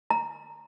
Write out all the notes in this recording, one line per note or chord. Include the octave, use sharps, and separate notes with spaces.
A#5